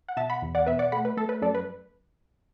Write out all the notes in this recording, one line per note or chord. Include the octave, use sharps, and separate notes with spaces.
F#5
B2 E5 A5
F#5 B5
E2
D5 F#5
B2 B4 E5
D5 F#5
A3 F#5 B5
B4
A3 A4
B4
F#2 A4 D5
B4